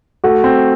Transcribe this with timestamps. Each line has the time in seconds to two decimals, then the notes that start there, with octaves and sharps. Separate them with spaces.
0.24 A3 F#4
0.44 C4